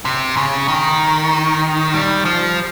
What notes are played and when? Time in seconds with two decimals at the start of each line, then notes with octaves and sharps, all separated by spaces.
0.05 C3
0.37 C#3
0.68 D#3
1.94 G3
2.25 F3